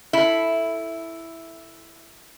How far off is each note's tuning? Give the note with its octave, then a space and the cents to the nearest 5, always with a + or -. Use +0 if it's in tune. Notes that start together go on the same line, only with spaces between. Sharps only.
E4 +0 A4 +0